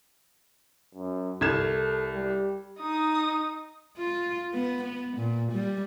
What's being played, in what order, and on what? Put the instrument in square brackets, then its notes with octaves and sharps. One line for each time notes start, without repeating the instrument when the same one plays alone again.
[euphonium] F#2
[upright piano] C2 G#6 E7 [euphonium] A4
[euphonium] G3
[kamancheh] D#4 D#6
[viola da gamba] F4
B3
B3
A#2
G3